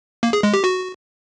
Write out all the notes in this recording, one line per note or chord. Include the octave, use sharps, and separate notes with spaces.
A#3
G#4
G#3
G4
F#4